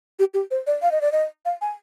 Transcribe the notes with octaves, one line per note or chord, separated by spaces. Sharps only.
G4
G4
C5
D5
F5
D#5
D5
D#5
F5
G#5